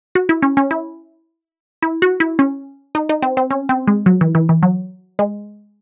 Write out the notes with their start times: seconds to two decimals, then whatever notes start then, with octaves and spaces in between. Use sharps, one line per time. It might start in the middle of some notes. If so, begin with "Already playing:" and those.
0.15 F#4
0.29 E4
0.42 C#4
0.57 C#4
0.71 E4
1.82 E4
2.02 F#4
2.20 E4
2.39 C#4
2.95 D#4
3.09 D#4
3.22 C4
3.37 C4
3.51 C#4
3.69 C4
3.87 G#3
4.06 F#3
4.21 E3
4.35 E3
4.49 E3
4.63 F#3
5.19 G#3